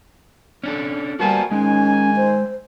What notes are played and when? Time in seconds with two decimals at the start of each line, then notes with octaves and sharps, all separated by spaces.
0.63 C#4 D4 A4
1.20 G3 A#3 B3 F#4 C5 G#5 A5
1.51 G#2 D#3 G#3 C#4 G#5
2.16 C5